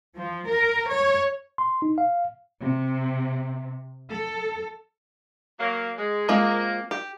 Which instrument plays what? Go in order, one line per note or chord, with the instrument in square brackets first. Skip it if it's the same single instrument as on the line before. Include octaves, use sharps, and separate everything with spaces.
[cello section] F3
A#4
C#5
[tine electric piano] C6
D#4
F5
[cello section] C3
A4
[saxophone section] F#3 A#3
G#3
[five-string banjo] G#3 C4 F4 [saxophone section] A#3
[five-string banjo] G4